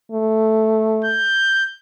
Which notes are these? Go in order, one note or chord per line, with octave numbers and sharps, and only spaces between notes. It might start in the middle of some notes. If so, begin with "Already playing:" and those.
A3
G6